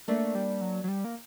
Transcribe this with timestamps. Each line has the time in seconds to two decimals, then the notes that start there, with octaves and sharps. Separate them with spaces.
0.08 A3 A#3 D4
0.35 G3
0.61 F#3
0.84 F#3
0.88 G3
1.04 A#3